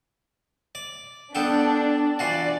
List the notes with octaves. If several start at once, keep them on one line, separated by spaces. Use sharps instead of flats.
D5
B3 D4 A4 G5
E3 F4 F#4 D5